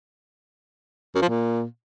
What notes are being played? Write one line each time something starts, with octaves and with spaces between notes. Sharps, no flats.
F#2
F3
A#2